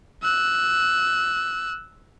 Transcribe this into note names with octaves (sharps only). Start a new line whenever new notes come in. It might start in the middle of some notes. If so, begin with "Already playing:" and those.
E6 F#6